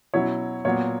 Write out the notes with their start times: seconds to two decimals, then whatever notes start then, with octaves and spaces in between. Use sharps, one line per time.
0.14 B2 F#3 C#4 E4 C#5
0.65 A#2 F#3 B3 C#5